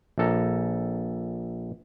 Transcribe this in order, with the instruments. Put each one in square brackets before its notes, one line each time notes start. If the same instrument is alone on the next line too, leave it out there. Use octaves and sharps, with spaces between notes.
[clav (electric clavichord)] A#1 A4 A#5